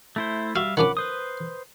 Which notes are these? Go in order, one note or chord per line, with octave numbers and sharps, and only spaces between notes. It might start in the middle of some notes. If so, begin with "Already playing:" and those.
A3 E4 C5
G3 F#4 E5 F5
D#3 F3 C#4 F#5 B5 D6
B4 C5 D#6